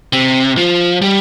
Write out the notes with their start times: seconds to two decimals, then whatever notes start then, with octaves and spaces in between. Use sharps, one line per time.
0.13 C3
0.57 F3
1.02 G3